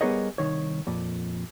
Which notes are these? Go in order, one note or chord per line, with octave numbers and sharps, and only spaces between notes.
G3 B3 G#4 A#4 C#5 D#5
C2 B2 D#3 C#5
F2 A#2